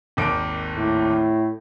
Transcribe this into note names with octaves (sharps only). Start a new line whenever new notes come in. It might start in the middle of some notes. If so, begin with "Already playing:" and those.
G#1 D#2 D7
A2